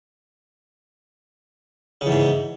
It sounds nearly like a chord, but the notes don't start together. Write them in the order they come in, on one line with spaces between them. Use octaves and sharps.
C#3 E2 G#2